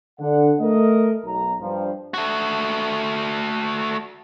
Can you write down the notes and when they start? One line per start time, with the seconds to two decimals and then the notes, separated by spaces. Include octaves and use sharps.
0.20 D3 F#5
0.60 A3 A#4 D#5
1.24 B1 A#5
1.60 G2 F3
2.14 A3 F#4